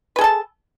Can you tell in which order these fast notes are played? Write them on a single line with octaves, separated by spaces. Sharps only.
B4 G#4 A4 A5